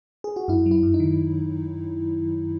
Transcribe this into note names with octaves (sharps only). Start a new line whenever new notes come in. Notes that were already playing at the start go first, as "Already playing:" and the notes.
G#4
F#4
F#2 E4
F#3
E4
F#2
D#4
D#3